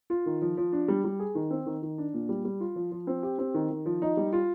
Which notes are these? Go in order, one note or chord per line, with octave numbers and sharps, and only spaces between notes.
F4
D#3
F3
F3
D4
G3
G3
G#4
D#3
C4
D#3
D#3
D4
A#2
G3
G3
F4
F3
F3
C4
G4
C4
D#3
D#3
F3
D#4
G3
F4